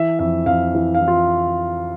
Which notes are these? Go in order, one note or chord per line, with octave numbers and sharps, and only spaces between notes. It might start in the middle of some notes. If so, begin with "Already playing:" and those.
Already playing: E3 E5
F2 E5
F2 F5
E3
F5
E3
F4